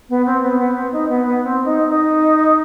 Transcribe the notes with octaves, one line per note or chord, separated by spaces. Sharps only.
B3
C4
B3
B3
C4
D#4
B3
B3
C4
D#4
D#4